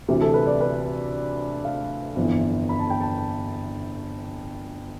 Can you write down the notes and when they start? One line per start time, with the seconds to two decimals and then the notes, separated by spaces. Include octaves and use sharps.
0.08 D2 C3 E3 G4
0.21 A4
0.34 B4
0.47 D5
0.60 B4
1.65 F5
2.16 G1 F2 E3
2.69 B5
2.80 A5
2.90 G5
3.01 A5